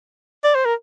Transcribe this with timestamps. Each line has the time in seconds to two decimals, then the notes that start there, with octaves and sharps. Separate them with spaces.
0.44 D5
0.55 C5
0.65 A#4